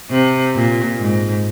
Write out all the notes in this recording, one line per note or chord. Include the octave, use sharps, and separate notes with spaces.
C3
A#2
G#2